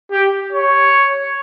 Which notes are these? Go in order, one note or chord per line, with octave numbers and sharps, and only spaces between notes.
G4
C#5